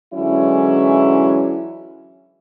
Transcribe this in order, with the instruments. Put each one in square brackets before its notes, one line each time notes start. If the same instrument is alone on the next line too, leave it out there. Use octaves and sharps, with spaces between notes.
[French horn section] D3 E3 F#3 G#3 C#4 E4